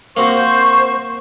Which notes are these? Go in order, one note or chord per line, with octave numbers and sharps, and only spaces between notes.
A#3 C4 F#4 C5 C#6